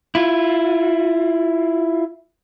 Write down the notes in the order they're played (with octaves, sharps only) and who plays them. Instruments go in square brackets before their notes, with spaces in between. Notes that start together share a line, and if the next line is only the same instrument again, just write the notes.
[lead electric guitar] E4 F4